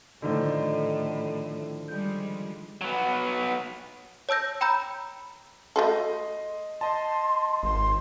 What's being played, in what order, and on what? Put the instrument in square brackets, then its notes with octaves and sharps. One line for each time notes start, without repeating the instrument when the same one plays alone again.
[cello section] A2 [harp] D3 D#3 F3
[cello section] F3 G3 G#3 [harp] G6
[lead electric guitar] F#3 B3
[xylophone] C#5 A5 E6 G6 A#6
G5 A#5 B5 E6 G6
[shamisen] A3 F#4 A4 [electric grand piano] D#5 C6
[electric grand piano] D#5 A5 [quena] C6
[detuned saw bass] G#1 [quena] C6